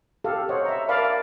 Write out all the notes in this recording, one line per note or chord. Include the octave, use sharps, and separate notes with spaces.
G4 A4 F5
C5 C#5 D#5 F#5
E5 A#5
A#4 D5 F5 A5 B5